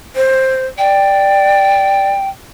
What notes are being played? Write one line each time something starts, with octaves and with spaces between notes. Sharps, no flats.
C5
D5 G5